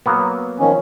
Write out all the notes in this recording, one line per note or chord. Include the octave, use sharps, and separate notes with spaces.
F#3 A#3 B3
D#3 F3 C#4